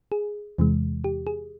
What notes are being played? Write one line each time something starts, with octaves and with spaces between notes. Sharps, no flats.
G#4
E2 C3 E3 G#3
G4
G#4